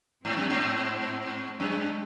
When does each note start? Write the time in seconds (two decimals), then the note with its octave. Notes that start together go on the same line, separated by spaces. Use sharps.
0.24 G#2 C4
0.37 F#2
0.50 G#2
1.59 F#2 G#3